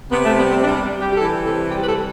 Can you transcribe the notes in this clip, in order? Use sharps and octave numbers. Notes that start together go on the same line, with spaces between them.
C3 B3
A3
G3 B3
C4
G3 D4
G3
G4
G4
E3 A4
C3 A4
G3 G4
B4
A4